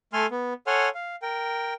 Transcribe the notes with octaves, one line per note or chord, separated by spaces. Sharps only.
A3 A4 G#5 C6 F6
B3
A4 C#5 F#5 G#5 C6 F6
F5
A#4 G5